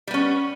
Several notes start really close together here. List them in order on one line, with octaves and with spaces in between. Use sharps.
G3 B3 C#4